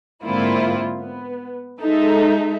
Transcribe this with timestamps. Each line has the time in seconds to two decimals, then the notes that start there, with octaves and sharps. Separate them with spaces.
0.24 G#2 D3 A#3 C4 E4 F4
0.98 B3
1.81 G#3 D#4 A4 E5